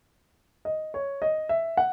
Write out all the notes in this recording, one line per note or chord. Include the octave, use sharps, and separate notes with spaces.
D#5
C#5
D#5
E5
F#5